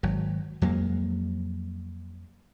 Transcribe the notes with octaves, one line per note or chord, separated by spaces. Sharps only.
G#1 F#3
F2 F#3 G#3 A#3